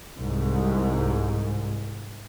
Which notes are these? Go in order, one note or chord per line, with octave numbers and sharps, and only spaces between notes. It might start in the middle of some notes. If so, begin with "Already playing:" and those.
C2 G#2